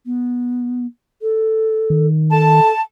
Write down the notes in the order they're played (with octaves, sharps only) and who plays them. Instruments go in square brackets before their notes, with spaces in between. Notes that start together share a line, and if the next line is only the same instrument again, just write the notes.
[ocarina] B3
A4
[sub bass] D#3
[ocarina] A4 [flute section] A5